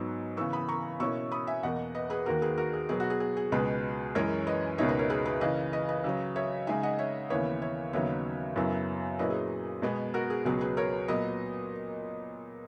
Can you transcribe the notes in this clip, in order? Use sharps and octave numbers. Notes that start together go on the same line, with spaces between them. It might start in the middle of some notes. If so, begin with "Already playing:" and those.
Already playing: G#2 F#3 B3 D#4 C#6 E6
C#3 E3 B3 C#6 E6
B5 D#6
A#5 C#6
B2 A#3 C#4 E4 C#6 E6
B5 D#6
E5 G#5
E2 B2 A#3 D#5 F#5
B4 D#5
G#4 B4
D#2 D#3 A#3 F#4 A#4
G#4 B4
F#4 A#4
G#4
B2 F#3 B3 G#4
F#4
G#4
G#4
G#4
C#2 B2 G#3 G#4 B4
F#2 E3 G#3 C#4 A#4 C#5
B4 D#5
C#2 B2 A#3 D#4 C#5 E5
B4 D#5
A#4 C#5
G#4 B4
G#4 B4
C#3 E3 A#3 B4 D#5
B4 D#5
B4 D#5
C#3 F#3 C#4
C#5 E5
C#3 G#3 D#4 E5 G#5
D#5 F#5
C#5 E5
D#2 C#3 E3 B3 C#5 E5
C#5 E5
D#2 C#3 F#3 B3 D#4 C#5 E5
F#2 C#3 F#3 B3 E4
A#2 F#3 C#4 E4 B4 D#5
G#4
B2 G#3 B3
F#4 A#4
G#4
C#2 B2 F#3 B3 G#4
G#4 B4
A#4 C#5
A#2 F#3 B3 B4 D#5